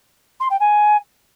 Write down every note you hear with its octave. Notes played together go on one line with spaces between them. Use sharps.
C6
G5
G#5